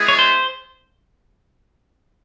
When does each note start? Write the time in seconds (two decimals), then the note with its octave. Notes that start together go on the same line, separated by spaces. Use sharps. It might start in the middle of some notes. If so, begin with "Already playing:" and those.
Already playing: G#3 B3 E4 G#4
0.08 C#5
0.19 C5